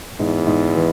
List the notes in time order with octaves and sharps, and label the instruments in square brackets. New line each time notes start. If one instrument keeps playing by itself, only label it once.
[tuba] E2 [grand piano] G#2
[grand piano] G#2
E3